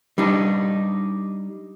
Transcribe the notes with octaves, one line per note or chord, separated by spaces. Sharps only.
G3 D4 D#4